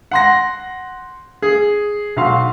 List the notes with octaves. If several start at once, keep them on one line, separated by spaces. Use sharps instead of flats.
F#5 C6 A#6
G#4
B1 F#4 F5 C6